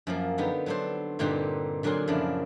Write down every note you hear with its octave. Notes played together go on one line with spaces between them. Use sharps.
F#2 F3 A#3
D3 B3 D#4 G4
F#3 B3 D4 A4 C5
G2 A#2 D3 C4 D#4 G4
A#2 D3 F#3 G#4 A#4 C6
F#2 C#3 F3 D4 E4